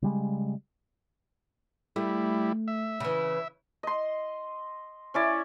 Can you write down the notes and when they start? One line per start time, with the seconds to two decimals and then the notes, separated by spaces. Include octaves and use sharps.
0.02 C#3 G3 G#3
1.96 G3 A3 E4
2.68 E5
3.00 C#3 E3
3.83 D#5 C6
5.14 C#4 E4 D5